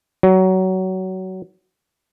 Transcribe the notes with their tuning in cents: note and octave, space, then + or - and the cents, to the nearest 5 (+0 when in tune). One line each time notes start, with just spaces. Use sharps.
F#3 +20